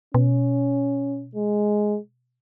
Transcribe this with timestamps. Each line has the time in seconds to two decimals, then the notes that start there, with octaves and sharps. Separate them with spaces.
0.14 B2 C#4
1.35 G#3